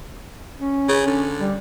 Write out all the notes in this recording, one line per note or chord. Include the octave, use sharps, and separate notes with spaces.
C#4
C#3
D3
G3